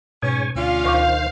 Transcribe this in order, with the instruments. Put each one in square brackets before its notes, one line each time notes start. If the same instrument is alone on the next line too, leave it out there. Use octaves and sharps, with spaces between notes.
[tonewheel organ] G#2 C#5 G#5 [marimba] B2 [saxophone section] C#4
[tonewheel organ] D2 [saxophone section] C#4 D4 F4 [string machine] F5
[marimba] D2 C#6 D6 [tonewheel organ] D#3 C5